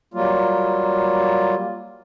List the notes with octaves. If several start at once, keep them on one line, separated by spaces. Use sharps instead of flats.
F#3 G3 A#3 F4